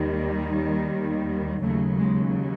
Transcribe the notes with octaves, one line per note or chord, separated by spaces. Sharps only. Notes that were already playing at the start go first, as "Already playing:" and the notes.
Already playing: D#2 D#3 G3
A#3
A#3
D#2 C#3 F#3 A3
G#3